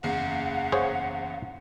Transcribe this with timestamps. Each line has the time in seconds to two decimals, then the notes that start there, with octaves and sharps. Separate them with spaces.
0.03 F#1 E2 F5 F#5 C7
0.72 G#4 C5 C#5